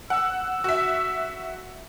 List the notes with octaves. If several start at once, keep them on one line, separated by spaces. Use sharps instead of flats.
F#5 E6
F#4 E5